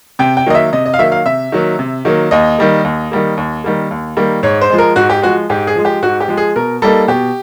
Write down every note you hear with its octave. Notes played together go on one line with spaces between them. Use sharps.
C3 G5
G5
D#3 F#3 A#3 D#5
E5
C3 D#5
D#5
F5
D#3 F#3 A#3 E5
F5
C3 E5
D#3 F#3 A#3
C3
D#3 F#3 A#3
D#2 D#5
D#3 G3 A#3
D#2
D#3 G3 A#3
D#2
D#3 G3 A#3
D#2
D#3 G3 A#3
G#2 C#5
C5
F3 G#3
A#4
G#2 F#4
G4
F3 G#3 F#4
G#2 G4
G#4
F3 G#3
G4
G#2 F#4
G4
F3 G#3
G#4
B2 A#4
G3 A#3 D#4 A4
B2 G4